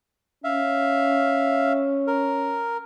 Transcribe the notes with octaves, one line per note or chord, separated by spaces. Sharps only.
C#4 E5 F5
A#4